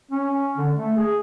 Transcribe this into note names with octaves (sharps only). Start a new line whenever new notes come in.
C#4
D3
A3
G#4